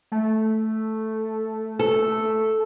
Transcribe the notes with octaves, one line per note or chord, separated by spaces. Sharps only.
A3
A4